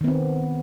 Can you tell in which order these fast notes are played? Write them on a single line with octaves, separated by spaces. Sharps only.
D#3 B3 C4